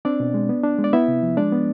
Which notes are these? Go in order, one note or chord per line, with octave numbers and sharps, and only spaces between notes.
C4 D4 D5
B2
G#3
B3
D4
G#3
D5
B3 E4 E5
C3
F3
G#3 D4 D5
B3